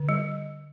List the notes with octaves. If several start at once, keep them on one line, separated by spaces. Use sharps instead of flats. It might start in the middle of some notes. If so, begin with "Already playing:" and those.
Already playing: D3
G3